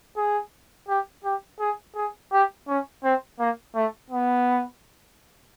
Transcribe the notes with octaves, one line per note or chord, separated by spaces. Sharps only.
G#4
G4
G4
G#4
G#4
G4
C#4
C4
A#3
A3
B3